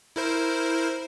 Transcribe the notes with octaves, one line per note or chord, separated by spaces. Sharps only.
E4 A#4 C5